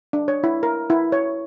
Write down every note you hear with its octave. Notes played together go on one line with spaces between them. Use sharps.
D4
C#5
E4
A#4
E4
C#5